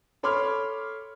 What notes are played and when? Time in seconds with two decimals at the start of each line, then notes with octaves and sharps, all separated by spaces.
0.23 A4 C#5 B5 C6 D6 F6